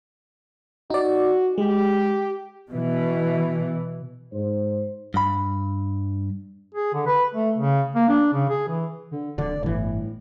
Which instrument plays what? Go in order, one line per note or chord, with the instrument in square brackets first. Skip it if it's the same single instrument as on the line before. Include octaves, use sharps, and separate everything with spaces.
[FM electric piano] D#4 D5 [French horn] F#4
[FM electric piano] G#3 [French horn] G4
[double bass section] B2 E3
[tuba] G#2 [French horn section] C5
[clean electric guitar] G2 B5
[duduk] G#4
D3
B4
A3
C#3
A#3
D4
C#3
G#4
E3
[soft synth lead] D3
[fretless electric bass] D1 D3 [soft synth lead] D5
[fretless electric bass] G1 E3 [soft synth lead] A2